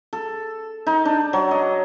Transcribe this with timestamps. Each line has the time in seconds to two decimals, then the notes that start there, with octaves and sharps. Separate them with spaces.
0.13 A4
0.87 D#4
1.05 D4
1.33 F#3
1.51 D#5